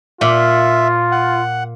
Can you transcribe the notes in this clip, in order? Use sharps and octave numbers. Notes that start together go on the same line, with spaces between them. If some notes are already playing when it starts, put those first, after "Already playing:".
A#2 F4 E5
F#5